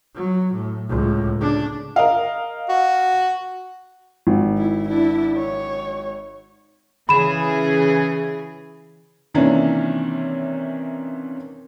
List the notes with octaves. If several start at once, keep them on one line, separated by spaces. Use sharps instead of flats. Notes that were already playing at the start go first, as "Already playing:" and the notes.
F#3
A2
C#2 A2
C#3 D4
A#4 D#5 F5
F#4
G#1
E4
D4 E4
C#5
C#3 E3 G#4 B5 E7
C3 D#3 E3 A#3 C#4 D4